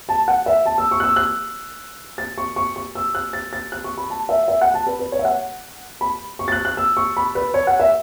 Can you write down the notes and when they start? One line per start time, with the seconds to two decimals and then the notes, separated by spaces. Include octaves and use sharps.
0.09 A5
0.28 F#5
0.46 E5
0.66 A5
0.78 E6
0.91 C#6
1.00 F#6
1.03 E6
1.16 F#6
2.18 A6
2.38 C#6
2.56 C#6
2.76 C#6
2.95 E6
3.15 F#6
3.33 A6
3.53 A6
3.72 F#6
3.84 C#6
3.98 B5
4.10 A5
4.29 E5
4.48 E5
4.61 F#5
4.74 A5
4.87 B4
4.99 B4
5.12 C#5
5.19 E5
5.25 F#5
6.01 B5
6.39 C#6
6.48 A6
6.52 F#6
6.65 F#6
6.77 E6
6.97 C#6
7.17 B5
7.35 B4
7.54 C#5
7.67 F#5
7.80 E5